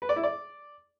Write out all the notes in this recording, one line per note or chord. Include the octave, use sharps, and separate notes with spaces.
B4
D5
E4
D5